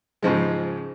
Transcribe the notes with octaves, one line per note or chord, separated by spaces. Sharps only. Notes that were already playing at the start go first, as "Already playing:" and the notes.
G#2 C#3 F3 G#3